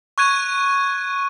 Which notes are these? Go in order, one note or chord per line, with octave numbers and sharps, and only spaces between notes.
C#6 F#6 G#6 D#7